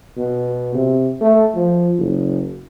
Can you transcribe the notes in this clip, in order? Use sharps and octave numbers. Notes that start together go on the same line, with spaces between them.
B2
C3
A3
F3
F#1